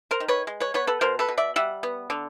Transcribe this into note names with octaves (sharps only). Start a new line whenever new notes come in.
A#4 C5
D#3
B4 C#5
G#3
B4 C#5
B3 B4 C#5
A4 B4
B2 A#4 C5
A4 B4
B2
D5 E5
G3 E5 F#5
B3
D3